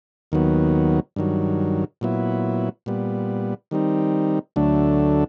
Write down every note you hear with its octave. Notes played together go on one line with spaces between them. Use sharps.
D#2 D#3 F#3 B3
G2 D#3 F#3
A#2 F#3 B3 E4
A#2 G3 B3
D#3 G3 C4 D#4
D2 D3 F#3 A3 D4